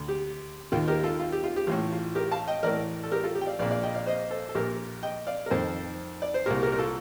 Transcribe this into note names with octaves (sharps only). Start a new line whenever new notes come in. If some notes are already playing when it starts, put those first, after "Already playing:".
Already playing: D2 D3
G4
D#2 D#3 F4
G4 A#4
F4 A4
F4
G4
F4
G4
A1 A2 F4
F4
G4 A#4
F5 A5
D#5 G5
A1 A2 A#4 D5
A4
G4 A#4
F4 A4
G4
G5
D5 F5
A#1 A#2 D5 F5
D5 F5
D#5 G5
D5 F5
C5 D#5
A4 C5
A4
A#1 A#2 G4 A#4
D#5 G5
D5 F5
A#4
F2 D#3 A4 C5
D5
C5
C2 A#2 G4 A#4
G4 A#4
A#4
F4 A4